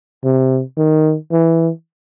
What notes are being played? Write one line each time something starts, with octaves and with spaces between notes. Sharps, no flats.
C3
D#3
E3